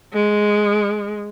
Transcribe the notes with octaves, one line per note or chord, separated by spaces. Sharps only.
G#3